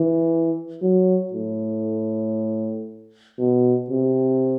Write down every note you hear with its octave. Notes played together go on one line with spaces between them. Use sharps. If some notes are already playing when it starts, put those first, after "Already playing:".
Already playing: E3
F#3
A2
B2
C3